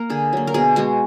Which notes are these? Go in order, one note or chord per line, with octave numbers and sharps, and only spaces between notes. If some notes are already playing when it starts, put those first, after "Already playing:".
Already playing: A#3 A#4
D3 G#4
F#3 A#3
A#4
B2 G#4
G#3 B3 F#4